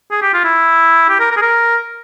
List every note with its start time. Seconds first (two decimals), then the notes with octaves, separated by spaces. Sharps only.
0.11 G#4
0.22 G4
0.34 F4
0.44 E4
1.09 G4
1.20 A#4
1.31 A#4
1.37 G#4
1.42 A#4